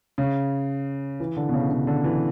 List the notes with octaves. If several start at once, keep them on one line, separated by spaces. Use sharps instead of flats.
C#3
E3
D3
B2
C#3
C#3
D3
E3